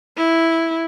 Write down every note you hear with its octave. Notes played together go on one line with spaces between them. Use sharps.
E4